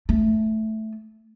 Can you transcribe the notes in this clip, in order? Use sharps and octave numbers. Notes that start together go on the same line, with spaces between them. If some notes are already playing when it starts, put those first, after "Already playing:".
A3